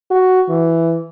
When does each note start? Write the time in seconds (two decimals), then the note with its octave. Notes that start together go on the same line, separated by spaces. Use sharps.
0.11 F#4
0.49 E3